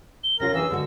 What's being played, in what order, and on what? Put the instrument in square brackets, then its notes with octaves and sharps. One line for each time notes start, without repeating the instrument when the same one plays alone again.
[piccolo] G7
[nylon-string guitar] C3 C#4 F4 [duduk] A#4 [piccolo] A#6
[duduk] E3 [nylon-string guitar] D4 E4 G#4 [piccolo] E6
[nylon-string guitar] G2 G#3 F#4 [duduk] D3